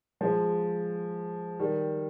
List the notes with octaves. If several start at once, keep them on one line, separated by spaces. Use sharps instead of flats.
F3 G#3
D#3 G3